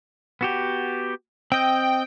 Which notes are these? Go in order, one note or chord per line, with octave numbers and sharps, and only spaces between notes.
B3 F#4 G4
C4 D#5 G5